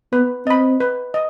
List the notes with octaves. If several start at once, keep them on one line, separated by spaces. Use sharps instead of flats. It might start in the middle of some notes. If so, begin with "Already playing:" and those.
B3 B4
C4 D#5 B5
B4
D#5